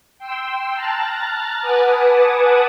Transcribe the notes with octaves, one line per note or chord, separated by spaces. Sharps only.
G5 C6 E6
A5 A#5 F6 F#6 A6
B4 F#5 G#5 A5 D6 D#6